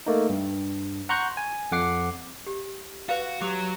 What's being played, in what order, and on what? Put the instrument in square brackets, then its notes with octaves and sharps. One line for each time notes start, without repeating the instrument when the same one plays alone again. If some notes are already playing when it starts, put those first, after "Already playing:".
[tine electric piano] A3 A#3 D#4
G2
F#5 A#5 C6 C#6 F#6 G6
G#5
F2 F#5 D6 C7
[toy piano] G4
[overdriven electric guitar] F#4 [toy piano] B4 F5
[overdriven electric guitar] F#3 [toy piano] G4 D6